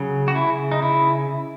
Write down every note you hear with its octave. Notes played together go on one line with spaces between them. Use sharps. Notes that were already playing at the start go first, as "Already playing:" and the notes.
Already playing: C#3 F#3
F#4
C#3 E4
D#4
C#3 E4